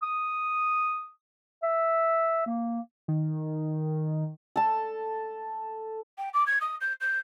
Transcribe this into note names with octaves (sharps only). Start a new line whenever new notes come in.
D#6
E5
A#3
D#3
A4 A5
G5
D6
G#6
D#6
G6
G6